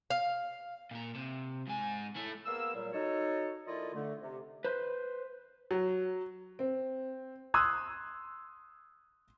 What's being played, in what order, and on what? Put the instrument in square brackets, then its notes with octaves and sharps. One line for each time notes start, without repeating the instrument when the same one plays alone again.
[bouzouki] F5
[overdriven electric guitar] A#2 A#4
C3
G#2 G#5
A3 E4
[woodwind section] A#3 B3 G#4 A#4 F5 E6
A#2 F#3 G3
D#4 F#4 A4 C#5
D#3 A3 E4 F4 D5 D#5
D3 A3
C3
[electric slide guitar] B4 C5
[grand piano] F#3
[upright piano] C4
[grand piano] C6 D#6 E6 F#6 G#6